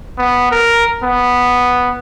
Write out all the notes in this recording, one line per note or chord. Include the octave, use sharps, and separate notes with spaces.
B3
A#4
B3